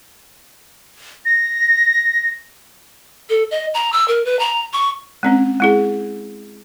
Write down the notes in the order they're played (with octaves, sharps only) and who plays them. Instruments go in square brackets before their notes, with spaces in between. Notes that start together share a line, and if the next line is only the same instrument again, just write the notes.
[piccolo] A#6
[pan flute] A4
D#5
A#5
E6
A#4
B4
A#5
C#6
[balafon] G#3 C4 C#4
G#3 E4 G#4